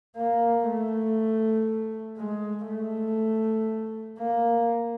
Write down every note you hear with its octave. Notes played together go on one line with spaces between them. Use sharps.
A#3
A3
G#3
A3
A#3